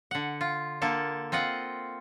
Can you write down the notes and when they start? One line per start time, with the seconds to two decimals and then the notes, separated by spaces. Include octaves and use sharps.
0.11 D3 F#5
0.41 F4
0.82 D3 A#3 A4
1.32 C4 F4 D#5 F#5